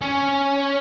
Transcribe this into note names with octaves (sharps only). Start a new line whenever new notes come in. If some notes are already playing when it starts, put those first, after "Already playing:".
C#4